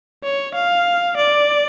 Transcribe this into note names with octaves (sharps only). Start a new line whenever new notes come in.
C#5
F5
D5